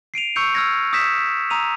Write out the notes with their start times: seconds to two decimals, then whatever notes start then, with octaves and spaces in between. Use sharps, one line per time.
0.14 C7 D7 D#7 F7
0.36 C#6 E6 G6 C#7 F7
0.55 E6 F6 G#6 A#6
0.93 D#6 E6 G6 A#6 B6 E7
1.18 B6
1.50 A#5 D#6 E6 D#7 F7